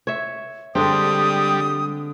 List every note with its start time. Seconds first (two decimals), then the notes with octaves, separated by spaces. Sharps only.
0.07 C#5 E5
0.75 D3 G3 G#3 C4 D4 D#6